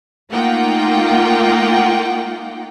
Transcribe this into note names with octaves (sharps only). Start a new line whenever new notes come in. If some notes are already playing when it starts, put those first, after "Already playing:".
A3 A#3 D#4 F4 F#5 G5